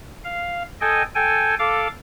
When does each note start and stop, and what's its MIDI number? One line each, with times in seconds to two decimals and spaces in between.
0.24 0.63 77
0.81 1.02 69
0.81 1.02 75
0.81 1.02 79
0.81 1.02 80
1.15 1.55 69
1.15 1.55 79
1.15 1.55 80
1.59 1.88 69
1.59 1.88 77
1.59 1.88 86